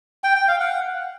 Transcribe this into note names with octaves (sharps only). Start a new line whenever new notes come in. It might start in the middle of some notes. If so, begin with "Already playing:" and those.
G5
G5
F5
F#5